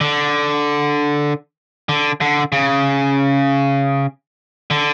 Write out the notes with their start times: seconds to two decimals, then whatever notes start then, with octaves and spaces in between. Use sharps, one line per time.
0.01 D3
1.89 D3
2.21 D3
2.52 C#3
4.71 D3